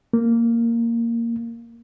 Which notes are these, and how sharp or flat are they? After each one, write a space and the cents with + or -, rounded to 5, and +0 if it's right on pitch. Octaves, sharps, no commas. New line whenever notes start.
A#3 -10